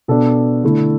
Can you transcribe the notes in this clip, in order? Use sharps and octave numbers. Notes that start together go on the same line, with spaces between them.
B2 B3 D4 A4
D3 A3 E4